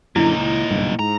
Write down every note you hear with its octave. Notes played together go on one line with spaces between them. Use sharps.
F#2 A#2 D3 D#4 E4
C#2
F#1 B1 G2
G#2 A#5